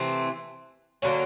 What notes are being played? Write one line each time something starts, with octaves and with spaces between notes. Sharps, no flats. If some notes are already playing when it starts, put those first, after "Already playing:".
Already playing: C3 E3 A3 C4
D3 F#3 A#3 C#4